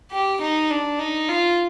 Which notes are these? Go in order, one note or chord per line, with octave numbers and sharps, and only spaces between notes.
G4
D#4
D4
D#4
F4